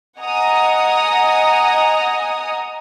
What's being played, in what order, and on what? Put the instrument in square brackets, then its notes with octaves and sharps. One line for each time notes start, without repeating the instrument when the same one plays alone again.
[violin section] D#5 F#5 G#5 A#5 D#6